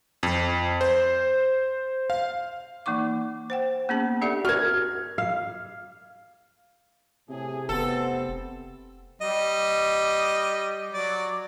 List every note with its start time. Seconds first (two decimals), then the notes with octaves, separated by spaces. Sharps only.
0.23 F2
0.81 C5
2.10 F5
2.86 E3 A#3 D#4 C#6 D6
3.50 C5 F#5 G5
3.89 A#3 B3 C#4 G#4 A5
4.21 D4 G4 A4 D5 E5 F#5
4.45 F#4 A#4 F6 G#6
5.18 F5
7.29 A2 C3 G#4
7.69 F1 B3 C4 A4
9.22 G3 D#5
10.94 F#3 D5